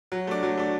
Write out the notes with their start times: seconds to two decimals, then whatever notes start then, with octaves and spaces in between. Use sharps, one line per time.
0.12 F#3
0.27 A3 D4
0.43 F#3
0.57 A3 D4